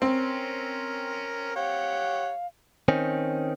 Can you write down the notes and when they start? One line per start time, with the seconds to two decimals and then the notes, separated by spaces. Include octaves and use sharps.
0.02 C4 C#4 A#4
1.56 G4 C#5 F5 F#5
2.88 D#3 C4 C#4